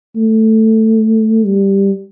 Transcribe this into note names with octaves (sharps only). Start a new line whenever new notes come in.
A3
G3